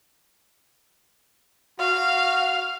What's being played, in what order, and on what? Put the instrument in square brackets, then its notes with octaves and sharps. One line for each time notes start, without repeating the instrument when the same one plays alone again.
[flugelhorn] F#4 [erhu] F5